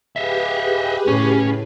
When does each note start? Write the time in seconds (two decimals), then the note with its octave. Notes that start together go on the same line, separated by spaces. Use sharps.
0.16 G4 G#4 B4 D#5 E5
1.07 A2 C#3 C#4